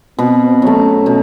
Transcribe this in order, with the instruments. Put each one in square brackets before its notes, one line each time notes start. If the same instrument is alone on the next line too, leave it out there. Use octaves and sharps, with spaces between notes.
[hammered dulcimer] B2 [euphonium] C4
[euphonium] C4
[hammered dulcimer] F#3 A3
[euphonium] C#4
[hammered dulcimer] B2